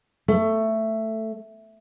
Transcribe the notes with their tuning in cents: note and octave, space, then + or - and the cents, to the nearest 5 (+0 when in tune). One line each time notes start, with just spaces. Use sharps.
A3 +10